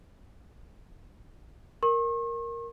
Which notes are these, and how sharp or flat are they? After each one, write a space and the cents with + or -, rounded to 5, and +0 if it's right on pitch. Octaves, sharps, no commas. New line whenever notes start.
A#4 +0 C#6 -45